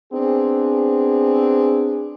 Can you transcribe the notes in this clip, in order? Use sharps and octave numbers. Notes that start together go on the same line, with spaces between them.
B3 C4 D4 G#4